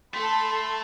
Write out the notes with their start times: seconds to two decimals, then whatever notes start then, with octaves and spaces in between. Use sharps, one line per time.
0.14 A3 A4 B5 C6